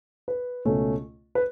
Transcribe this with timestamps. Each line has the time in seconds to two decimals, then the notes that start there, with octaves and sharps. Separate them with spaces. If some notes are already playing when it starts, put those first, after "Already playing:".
0.28 B4
0.65 C#2 B2 A3 C#4
1.35 B4